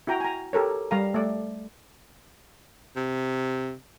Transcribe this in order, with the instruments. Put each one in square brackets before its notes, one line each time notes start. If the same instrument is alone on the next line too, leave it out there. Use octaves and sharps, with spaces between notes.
[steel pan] E4 F#4 G5 A#5
G#5 A#5
G4 A4 A#4 C#5
G3 F5 A#5
A3 D5
[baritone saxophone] C3